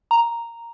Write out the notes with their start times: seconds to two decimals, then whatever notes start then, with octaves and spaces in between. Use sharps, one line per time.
0.11 A#5